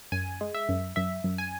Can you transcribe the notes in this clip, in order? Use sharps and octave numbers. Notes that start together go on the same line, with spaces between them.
F#2 G#5
G#3
E5
F#2
F#2 E5
F#2
G#5